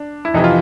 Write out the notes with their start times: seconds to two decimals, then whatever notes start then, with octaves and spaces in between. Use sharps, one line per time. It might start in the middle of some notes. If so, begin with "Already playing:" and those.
Already playing: D4
0.25 E4
0.34 F2 C3 E3 D#4
0.44 F4